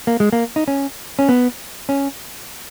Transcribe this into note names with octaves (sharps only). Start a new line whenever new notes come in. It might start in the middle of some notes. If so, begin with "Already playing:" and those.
A#3
G#3
A#3
D#4
C#4
C#4
B3
C#4